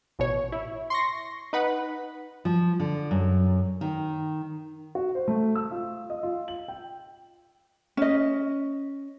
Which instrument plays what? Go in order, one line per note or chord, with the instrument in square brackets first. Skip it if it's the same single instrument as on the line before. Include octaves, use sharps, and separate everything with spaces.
[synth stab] A1 B2 C#5
E4
C6 C#6 A#6
D#4 B4 F#5 B5
[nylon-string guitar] F3
D3
F#2
D#3
[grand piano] F#4
C5
A3
E6
F4
D#5
F4
F#7
G5
[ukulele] C#4 D#5